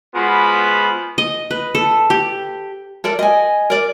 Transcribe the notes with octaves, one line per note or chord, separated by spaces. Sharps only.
G#3 B3 F4 F#4 C5 B5
D#5
B4
A4
G4
A4 A#4 D5
D#5 G#5
A#4 D5